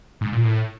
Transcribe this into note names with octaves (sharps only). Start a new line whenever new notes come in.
G#2
A#2
A2